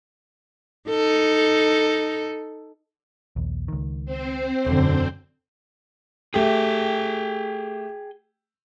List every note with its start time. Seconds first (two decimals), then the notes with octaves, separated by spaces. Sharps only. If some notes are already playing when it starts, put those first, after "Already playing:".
0.90 D#4 A4
3.36 A#1 D#2
3.68 C#2 D#3
4.05 C4 C5
4.66 E1 F#2 D3
6.34 A3 G4 G#4 G5